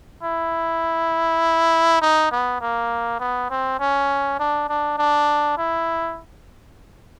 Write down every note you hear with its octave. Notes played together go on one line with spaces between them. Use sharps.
E4
D#4
B3
A#3
B3
C4
C#4
D4
D4
D4
E4